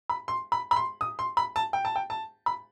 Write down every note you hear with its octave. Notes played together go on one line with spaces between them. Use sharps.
B5
C6
B5
B5
C6
D#6
C6
B5
A5
G5
A5
G5
A5
B5